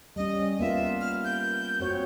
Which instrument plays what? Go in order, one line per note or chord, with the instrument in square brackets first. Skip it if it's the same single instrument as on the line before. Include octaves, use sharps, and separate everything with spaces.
[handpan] G3 C#4 [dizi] D#5
[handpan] A#3 B3 F4 [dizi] E5
[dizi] F6
G6
[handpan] C4 F#4 C#5